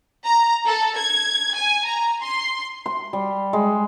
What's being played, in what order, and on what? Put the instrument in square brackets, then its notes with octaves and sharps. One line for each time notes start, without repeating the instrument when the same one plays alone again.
[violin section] A#5
A4
G#6
G#5
A#5
C6
[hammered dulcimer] C6
G3
G#3